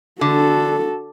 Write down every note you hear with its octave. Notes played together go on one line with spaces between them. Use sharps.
D3 F#4 A4